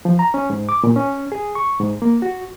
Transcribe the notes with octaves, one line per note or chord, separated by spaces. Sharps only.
F3
A#5
C#4
G#2
D6
A#2
C#4
G#4
C#6
G#2
A#3
F#4